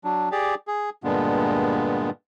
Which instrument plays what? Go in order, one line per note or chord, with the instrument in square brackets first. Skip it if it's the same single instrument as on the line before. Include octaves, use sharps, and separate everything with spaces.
[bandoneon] F#3 D4
G4 G#4 D5
G#4
G2 A#2 D3 G#3 B3